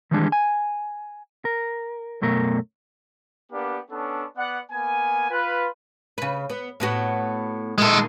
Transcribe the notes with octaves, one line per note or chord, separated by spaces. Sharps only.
D#3 E3 G3 G#3 D4 G#4
G#5
A#4
F#2 B2 A3 A#4
A#3 B3 D4 G4 D5
B3 C#4 D4 A4
B3 D5 F#5
A#3 B3 G#5
F4 B4
C#3 B4
B3
A2 B3 F#4
A#2 D#3 G#3 A4